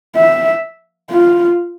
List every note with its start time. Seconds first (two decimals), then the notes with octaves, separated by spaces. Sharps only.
0.16 E5
1.11 F4